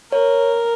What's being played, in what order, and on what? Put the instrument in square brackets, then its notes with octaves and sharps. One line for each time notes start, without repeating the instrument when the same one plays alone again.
[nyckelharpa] A#4 [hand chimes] C#5